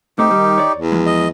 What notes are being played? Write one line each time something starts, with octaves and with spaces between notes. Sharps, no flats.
A2 A3 C4 D#4 G4
D#3 G3
C#5 D5
E2
F3 G#3
D#5